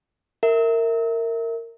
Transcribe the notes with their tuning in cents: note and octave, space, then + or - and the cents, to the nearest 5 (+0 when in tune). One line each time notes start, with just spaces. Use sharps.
A#4 -20 E5 -15